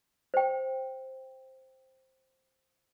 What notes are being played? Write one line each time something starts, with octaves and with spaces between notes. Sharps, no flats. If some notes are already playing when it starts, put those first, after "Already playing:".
C5 G5